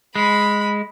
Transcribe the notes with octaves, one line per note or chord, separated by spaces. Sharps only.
G#3 B5